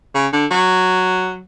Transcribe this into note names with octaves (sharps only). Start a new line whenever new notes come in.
C#3
D3
F#3